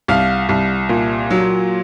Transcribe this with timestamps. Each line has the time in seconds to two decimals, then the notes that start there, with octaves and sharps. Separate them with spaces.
0.08 C2 F5
0.49 C2
0.89 A#2
1.30 F#3